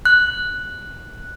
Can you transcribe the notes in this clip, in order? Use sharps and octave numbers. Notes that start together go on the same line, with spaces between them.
F#6